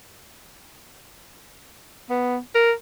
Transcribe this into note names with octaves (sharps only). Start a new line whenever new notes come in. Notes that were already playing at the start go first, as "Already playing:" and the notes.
B3
A#4